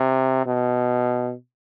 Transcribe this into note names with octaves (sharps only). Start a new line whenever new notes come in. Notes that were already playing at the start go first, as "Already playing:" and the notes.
Already playing: C3
B2